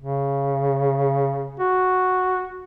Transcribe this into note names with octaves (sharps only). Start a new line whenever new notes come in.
C#3
F#4